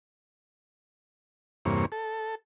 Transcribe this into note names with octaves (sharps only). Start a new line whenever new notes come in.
E2 G2 C3 A#3 C#5
A4